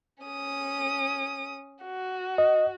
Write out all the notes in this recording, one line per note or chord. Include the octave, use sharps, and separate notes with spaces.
C#4 D#6
F#4
D#5